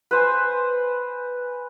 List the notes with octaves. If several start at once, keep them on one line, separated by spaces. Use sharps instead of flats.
B4 C5 G#5